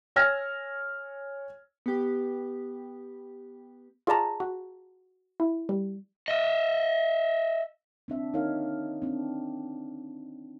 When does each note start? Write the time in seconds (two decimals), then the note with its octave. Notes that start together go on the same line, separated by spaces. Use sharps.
0.16 C#5 G#5 E6 F6 G#6 A#6
1.86 B3 G4
4.07 F4 G#4 D5 A5 A#5
4.40 F#4
5.40 E4
5.69 G3
6.28 D#5 E5
8.08 C4 D4 E5
8.33 D#3 D#4 A#4 C#5 F5
9.02 C4 D4